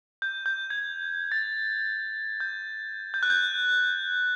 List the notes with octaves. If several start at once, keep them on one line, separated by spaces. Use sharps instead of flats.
G6
G6
G#6
A6
G6
G6
F#6
G6